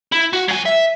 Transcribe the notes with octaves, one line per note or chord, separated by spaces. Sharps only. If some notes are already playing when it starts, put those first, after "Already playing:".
E4
F#4
F#3 G#5
E5